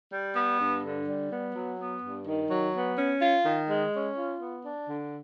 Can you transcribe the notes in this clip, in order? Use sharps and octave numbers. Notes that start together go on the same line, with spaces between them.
G3
B3
G2
D3
G3
B3
F#3
B3
G2
D#3
F#3
B3
C#4
F4
D#3
G#3
C#4
F4
B3
D4
D3